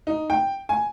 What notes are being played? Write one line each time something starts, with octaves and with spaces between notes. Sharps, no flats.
D#4
G5
G#5